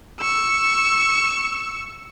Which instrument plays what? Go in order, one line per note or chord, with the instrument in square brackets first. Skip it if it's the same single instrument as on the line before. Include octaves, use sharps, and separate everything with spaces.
[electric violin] C#6 E6